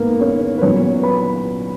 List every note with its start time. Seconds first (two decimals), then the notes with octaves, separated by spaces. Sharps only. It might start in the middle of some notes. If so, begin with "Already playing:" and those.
Already playing: G#2 A#3 B3 A#4
0.20 C#4 C#5
0.58 B4
0.62 A#2 F#3 B3 C#4 C#5
1.03 B4 B5